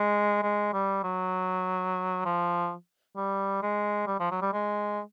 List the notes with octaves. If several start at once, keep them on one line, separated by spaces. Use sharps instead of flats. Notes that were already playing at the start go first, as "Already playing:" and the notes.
Already playing: G#3
G#3
G3
F#3
F3
G3
G#3
G3
F3
F#3
G3
G#3